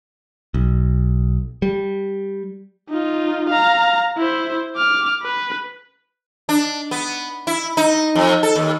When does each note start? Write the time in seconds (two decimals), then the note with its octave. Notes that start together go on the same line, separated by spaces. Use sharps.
0.54 B1
1.62 G3
2.89 D#4 F4
3.49 F5 A#5
4.17 E4 C5
4.76 D6 F6
5.23 B4
6.49 D4
6.91 B3
7.47 E4
7.77 D#4
8.15 F2
8.43 A4
8.56 D#2